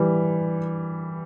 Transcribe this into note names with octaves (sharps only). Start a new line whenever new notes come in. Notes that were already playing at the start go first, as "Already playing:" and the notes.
Already playing: E3 G3